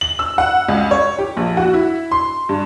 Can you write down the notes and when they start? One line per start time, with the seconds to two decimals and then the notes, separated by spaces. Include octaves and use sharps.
0.01 F#7
0.19 E6
0.38 F#5
0.68 C#2
0.91 C#5
1.19 G4
1.37 A#1
1.57 F#4
1.74 E4
2.11 C6
2.49 G2